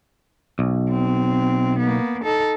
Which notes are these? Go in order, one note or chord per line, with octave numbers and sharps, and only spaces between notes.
B1
C4
A#3 B3
D#4 A4